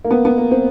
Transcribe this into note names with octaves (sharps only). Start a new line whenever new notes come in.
A#3
B3
B3
A#3
C4